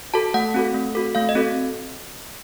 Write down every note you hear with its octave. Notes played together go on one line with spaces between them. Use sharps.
F#4 A4 A5
A3 F#5
C4 F#4 A4
A3
C4 F#4 A4
A3 F5
D#5
C4 F#4 A4